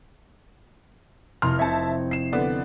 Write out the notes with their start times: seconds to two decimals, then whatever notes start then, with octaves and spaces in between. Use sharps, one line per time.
1.42 F1 E4 D#5 C6 F6
1.59 C4 C#5 E5 A5 G#6
2.11 C7 E7
2.32 D3 B3 D5